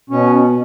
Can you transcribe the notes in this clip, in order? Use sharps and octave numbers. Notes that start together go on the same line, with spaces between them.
B2 C#4